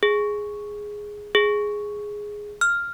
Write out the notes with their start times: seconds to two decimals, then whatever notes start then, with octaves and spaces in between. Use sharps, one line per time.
0.03 G#4
1.35 G#4
2.61 F6